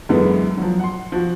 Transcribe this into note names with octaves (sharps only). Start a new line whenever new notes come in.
F#2 D3 E3 G#3 B3
F3 F#3
F#5 C6
F3 F#4